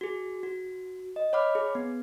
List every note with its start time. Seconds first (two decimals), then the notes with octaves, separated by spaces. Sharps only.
0.01 F#4 G#4
0.43 F#4
1.16 D#5
1.33 C#5 F#5 B5 D6 F6
1.55 G#4
1.75 B3